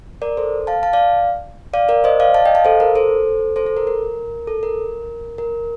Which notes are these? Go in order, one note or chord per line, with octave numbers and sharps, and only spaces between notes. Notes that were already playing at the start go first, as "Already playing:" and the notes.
A#4 D5
A4 C5
F5 A5
F5 A5
D5 F5
D5 F5
A#4 D5
C5 D#5
D5 F5
F5 A5
D#5 G5
F5 A5
A4 C5
A#4
A4 C5
A4 C5
A4
A#4
A#4
A4
A#4
A#4